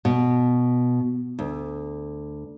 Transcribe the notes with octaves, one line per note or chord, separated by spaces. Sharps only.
B2
D2